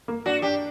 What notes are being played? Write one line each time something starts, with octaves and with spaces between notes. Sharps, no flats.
A#3
D4 F#4
D4 G4